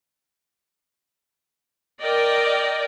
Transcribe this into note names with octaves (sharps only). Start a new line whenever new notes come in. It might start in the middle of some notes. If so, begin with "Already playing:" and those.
A#4 D5 D#5 G5